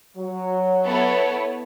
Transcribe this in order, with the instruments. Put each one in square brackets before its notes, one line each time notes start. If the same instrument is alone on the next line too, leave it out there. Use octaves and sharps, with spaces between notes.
[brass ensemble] F#3
[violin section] B3 E4 A4 C#5